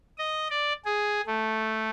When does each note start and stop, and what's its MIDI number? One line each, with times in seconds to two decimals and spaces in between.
0.18 0.47 75
0.50 0.73 74
0.85 1.21 68
1.26 1.90 57